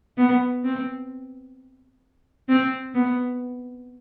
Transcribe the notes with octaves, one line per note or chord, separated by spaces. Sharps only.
B3
C4
C4
B3